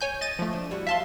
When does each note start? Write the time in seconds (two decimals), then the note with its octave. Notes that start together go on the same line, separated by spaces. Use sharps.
0.01 C#5 G#5 G6
0.21 D#5 A6 D#7
0.39 F3 A3
0.53 D4
0.71 G3 E4 F#4
0.87 F3 E5 F5 A5 C6